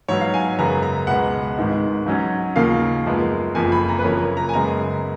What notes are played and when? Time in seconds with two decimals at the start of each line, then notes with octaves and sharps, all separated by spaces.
0.08 G#2 F#3 B3 C#5
0.21 F5
0.34 G#5
0.58 F#2 C#3 G#3 B3 A#5
0.83 A#5
1.07 C#2 B2 G#3 B3 F#5
1.58 G#1 G#2 D#3 G#3 B3
2.06 G#2 F#3 C#4
2.56 D#2 C#3 F3 A#3 F5
3.06 F#2 F3 G#3 B3
3.55 F#1 F2 F3 G#5
3.72 B5
3.89 A#5
3.99 B4
4.04 F#2 C#3 F3 A#3 C#5
4.37 A#5
4.49 G#5
4.54 F#2 C#3 G#3 B3 A#5